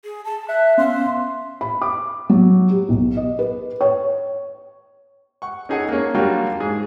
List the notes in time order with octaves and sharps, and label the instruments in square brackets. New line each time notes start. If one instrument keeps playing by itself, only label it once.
[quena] G#4
A5
[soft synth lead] E5 [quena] F#6
[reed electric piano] B3 C#4 F5 [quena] C6
[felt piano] B5
D6
F#3
G4
B1
D#5
B4
C#5
[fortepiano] F#5 C#6
C#4 D#4 G#4 A4 F#5 G#5
A#3 C#4
F#3 G3 A#3 D4 F4 F#4
G#2 G#4